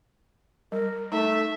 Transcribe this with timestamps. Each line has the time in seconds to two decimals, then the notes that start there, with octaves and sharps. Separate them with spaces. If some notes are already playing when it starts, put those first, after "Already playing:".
0.72 G3 A#4
1.12 A3 D#4 E5